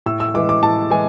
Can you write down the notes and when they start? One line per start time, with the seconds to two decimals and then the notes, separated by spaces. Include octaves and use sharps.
0.06 A2 E6
0.20 E6
0.34 E3 G#3 D6
0.49 D6
0.63 A2 A5
0.90 E3 G#3 G#5